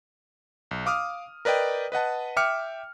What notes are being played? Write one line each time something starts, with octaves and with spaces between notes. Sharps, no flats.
B1
F5 D6 D#6 F6
A#4 B4 D5 D#5 G5
B4 D#5 F#5 A5
E5 G5 D6 F6 C#7